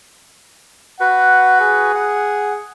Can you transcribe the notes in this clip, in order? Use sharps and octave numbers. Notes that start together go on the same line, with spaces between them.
F#4 B4 F#5
G#4
F#5